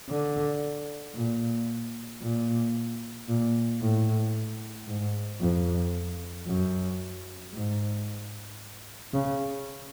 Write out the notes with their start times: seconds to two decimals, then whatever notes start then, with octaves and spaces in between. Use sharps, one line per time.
0.09 D3
1.15 A#2
2.22 A#2
3.28 A#2
3.82 A2
4.88 G#2
5.41 F2
6.47 F#2
7.54 G#2
9.14 C#3